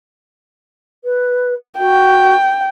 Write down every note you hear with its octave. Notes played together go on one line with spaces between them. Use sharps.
B4
F#4 G5